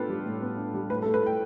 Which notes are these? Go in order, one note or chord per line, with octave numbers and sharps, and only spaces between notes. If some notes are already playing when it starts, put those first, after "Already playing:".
Already playing: A2 B3 D4 F4 G4 A4 B4
G3
A2
B3
D4
G3
A2 B4
A4
A3
B4
A2 G5